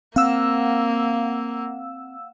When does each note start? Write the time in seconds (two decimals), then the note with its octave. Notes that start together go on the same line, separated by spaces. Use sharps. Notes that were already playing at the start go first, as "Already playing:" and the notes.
0.16 A#3 C4 F5 F#5 E6